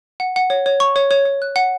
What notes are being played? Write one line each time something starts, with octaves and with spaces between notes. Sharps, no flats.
F#5
F#5
C#5
C#5
C#6
C#5
C#5
C#5
F#6
F#5